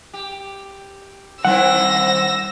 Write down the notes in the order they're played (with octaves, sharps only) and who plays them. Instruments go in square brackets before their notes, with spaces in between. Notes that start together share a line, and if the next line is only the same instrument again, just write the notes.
[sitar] G4
[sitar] D#3 C4 E4 [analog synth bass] G3 [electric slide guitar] F#5 [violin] E6 A#6